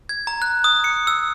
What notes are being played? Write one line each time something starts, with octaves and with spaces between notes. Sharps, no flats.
G#6
A#5
F#6
D#6
C#7
E6